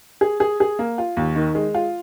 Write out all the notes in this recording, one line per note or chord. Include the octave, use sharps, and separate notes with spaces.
G#4
G#4
G#4
A#3
F4
D#2
D#3
G#3
F4